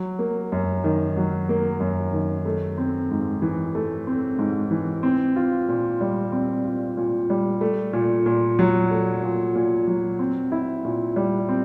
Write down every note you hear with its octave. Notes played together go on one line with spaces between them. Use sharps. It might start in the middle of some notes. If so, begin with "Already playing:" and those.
Already playing: F#3
A#3
F#2
D#3
F#3
A#3
F#2
D#3
A3
C4
G#2
E3
A3
C4
G#2
E3
C4
F4
A#2
G3
C4
F4
A#2
G3
A3
A#2
A#2
F#3
A3
A#2
A#2
F#3
C4
E4
A#2
G3
C4